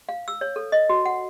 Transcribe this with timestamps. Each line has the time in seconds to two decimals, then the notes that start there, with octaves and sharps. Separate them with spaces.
0.09 F5
0.28 E6
0.41 C#5
0.56 A4
0.72 D#5
0.89 F#4
1.06 F#5